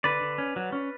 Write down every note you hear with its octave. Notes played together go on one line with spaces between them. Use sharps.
D3 B4 D5
D3
C#4
F#3
C#4